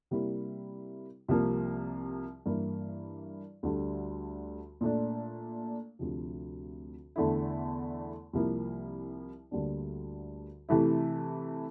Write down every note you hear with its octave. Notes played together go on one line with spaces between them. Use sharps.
C3 G3 A#3 E4
C2 C3 F3 A#3
G2 E3 A#3 E4
D2 D3 G3
A#2 A3 D4
D2 C3 F3
E2 D3 A3 E4
C2 C3 F3 A#3 E4
D2 D3 G3 A#3 D4
C3 E3 A3 E4